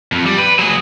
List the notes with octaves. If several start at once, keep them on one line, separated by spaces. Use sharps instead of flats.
F2
G3
B4
F#3 G#4